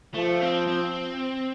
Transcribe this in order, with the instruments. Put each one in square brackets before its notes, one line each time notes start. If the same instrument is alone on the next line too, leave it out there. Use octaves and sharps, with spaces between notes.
[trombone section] F3 [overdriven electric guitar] A3
[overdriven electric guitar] C4
C4